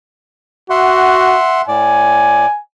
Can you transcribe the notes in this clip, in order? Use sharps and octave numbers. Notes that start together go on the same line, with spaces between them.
F#4 E5 F#5 C6
A2 D5 G#5